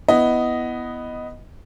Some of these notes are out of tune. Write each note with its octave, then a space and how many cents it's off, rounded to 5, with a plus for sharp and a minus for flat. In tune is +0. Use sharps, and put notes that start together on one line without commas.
B3 +0 E4 +0 D#5 +0